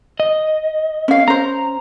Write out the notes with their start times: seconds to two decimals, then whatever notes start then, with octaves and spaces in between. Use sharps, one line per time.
0.20 D#5
1.08 C#4 F5
1.28 C#4 C5 A#5